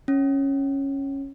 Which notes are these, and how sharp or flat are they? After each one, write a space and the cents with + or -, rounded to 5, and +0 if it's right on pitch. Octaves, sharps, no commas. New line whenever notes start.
C#4 -10